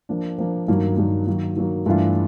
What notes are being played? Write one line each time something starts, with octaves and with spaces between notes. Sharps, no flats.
F3 A#3 D4
F3 A#3 D4
G2 D#3 F#3 A#3 D#4
G2 D#3 F#3 A#3 D#4
D#3 F#3 A#3
D#3 F#3 A#3
G2 E3 A3 D4 F4